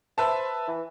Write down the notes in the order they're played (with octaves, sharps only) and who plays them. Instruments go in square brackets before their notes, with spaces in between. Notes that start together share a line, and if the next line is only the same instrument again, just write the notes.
[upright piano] B4 E5 A5 [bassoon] C5
[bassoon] E3